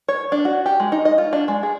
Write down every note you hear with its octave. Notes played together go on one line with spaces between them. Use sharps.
C#5
D4
F#4
G4
G#3
D#4
D#5
F4
D4
G#3
G#4